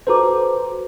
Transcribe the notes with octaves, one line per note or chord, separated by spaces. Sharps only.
F#4 A4 B4 C5 A#5 D6